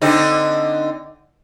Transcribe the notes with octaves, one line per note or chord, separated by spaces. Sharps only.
D3 C4 D#4